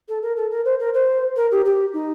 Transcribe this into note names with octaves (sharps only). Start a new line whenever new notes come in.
A4
A#4
A4
A#4
C5
A#4
C5
A#4
G4
G4
D#4